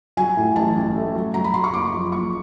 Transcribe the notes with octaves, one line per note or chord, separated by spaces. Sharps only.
F#3 G#5
A2
A1 A5
A1
A3
F#3
F#3 A#5
B5
F#3 C6
C#6
F#1 D6
F3
F#1 C#6